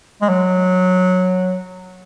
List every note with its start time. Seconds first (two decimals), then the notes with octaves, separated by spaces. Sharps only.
0.22 G#3
0.29 F#3